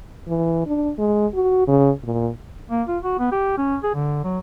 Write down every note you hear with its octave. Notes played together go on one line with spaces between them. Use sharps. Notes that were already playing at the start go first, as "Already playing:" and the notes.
E3
D4
G#3
F#4
C#3
A#2
A#3
F4
F#4
B3
G4
C#4
G#4
D3
F#3